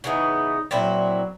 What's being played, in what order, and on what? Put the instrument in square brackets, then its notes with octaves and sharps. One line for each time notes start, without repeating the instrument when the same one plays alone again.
[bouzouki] C#3 E3 B3 [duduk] D#4
[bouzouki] A#2 C4 E4 [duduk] F#3